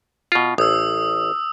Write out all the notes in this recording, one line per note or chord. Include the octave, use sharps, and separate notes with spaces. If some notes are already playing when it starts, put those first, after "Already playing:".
B2 F4
A1 D#6 E6